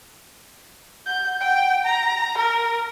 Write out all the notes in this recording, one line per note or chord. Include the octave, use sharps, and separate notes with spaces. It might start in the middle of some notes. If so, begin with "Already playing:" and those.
F#5 G6
G5
A#5
A#4 A#5